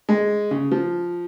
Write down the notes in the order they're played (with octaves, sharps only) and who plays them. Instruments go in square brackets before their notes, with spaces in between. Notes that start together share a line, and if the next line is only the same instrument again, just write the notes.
[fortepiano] G#3
C#3
F3